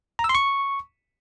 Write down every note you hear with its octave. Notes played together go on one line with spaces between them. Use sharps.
A#5
E6
C6
C#6